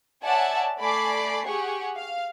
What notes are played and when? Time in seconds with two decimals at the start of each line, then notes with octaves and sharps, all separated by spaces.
0.24 C#5 D5 E5 F#5 G#5 A5
0.79 A3 D5 G#5 B5 D6 C7
1.45 G4 G#4 F#5 G#5 C#6
1.97 F5